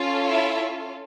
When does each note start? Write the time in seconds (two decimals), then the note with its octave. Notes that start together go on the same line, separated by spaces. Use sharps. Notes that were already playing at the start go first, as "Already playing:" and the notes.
Already playing: C#4 F4 A4
0.27 E4 E5